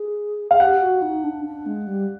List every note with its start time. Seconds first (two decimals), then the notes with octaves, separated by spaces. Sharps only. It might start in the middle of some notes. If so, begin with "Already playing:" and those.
Already playing: G#4
0.51 G#4 F5
0.60 G4 F#5
0.81 F#4
1.02 D#4
1.24 D4
1.45 D4
1.66 G#3
1.87 G3